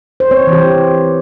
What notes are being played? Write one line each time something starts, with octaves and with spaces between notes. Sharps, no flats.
C5
C4 C#5
E3
G4